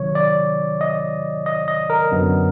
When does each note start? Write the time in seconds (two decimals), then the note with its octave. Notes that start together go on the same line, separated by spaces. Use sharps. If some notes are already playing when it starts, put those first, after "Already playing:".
Already playing: C3 D#3 F#3 C#5
0.15 D5
0.81 D#5
1.46 D#5
1.68 D#5
1.90 A#4
2.12 F#2 D3 F#3 B3